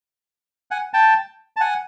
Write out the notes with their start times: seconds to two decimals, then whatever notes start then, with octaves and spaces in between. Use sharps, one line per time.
0.71 F#5 G#5
0.94 G5 A5
1.57 A5
1.61 F#5 G#5